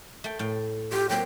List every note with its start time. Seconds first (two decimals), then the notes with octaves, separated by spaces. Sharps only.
0.24 A3 G5
0.39 A2 G5
0.92 F4 G4
1.09 F#3 A#3 C4 G5